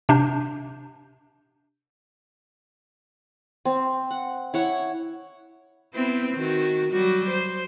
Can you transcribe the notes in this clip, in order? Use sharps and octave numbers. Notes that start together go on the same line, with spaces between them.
C3 D4 G6
C4
F#5
E4 C#5 F#5
B3 C4 E4
D#3 F#4
F#3 G3 F#4
C5